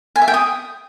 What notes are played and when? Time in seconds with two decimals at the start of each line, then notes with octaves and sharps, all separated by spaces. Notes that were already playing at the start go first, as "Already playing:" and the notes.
0.16 G#5
0.22 E5
0.28 G5
0.34 D#6